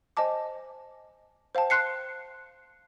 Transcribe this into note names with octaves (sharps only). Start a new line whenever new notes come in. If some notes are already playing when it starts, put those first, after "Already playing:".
C5 D#5 G#5 A5 D6
C5 F5 G5 A5
C6 F#6 C7 C#7